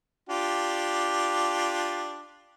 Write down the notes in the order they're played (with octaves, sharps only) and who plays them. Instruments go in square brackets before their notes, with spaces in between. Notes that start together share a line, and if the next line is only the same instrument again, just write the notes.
[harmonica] D4 F4 G4